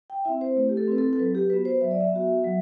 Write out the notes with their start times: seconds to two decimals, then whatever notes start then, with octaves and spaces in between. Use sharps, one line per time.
0.10 G5
0.25 C4 E4 E5
0.41 C5
0.56 A3 B4
0.69 G4
0.77 A4
0.88 C4 E4 B4
0.98 A4
1.13 A4
1.18 F#3 B4
1.35 G4
1.50 B3 F#4 B4
1.65 C5
1.81 F#3 E5
1.91 D5
2.01 E5
2.13 B3 F#4
2.44 F#3